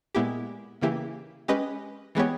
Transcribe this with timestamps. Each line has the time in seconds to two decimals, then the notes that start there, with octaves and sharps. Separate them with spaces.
0.15 A#2 G#3 B3 E4 G4
0.81 C#3 E3 A#3 E4 G4
1.48 G#3 C#4 G4 B4 D#5
2.15 E3 G#3 B3 G4 C#5